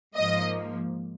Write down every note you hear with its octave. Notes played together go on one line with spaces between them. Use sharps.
G#2 F3 A#3 D#5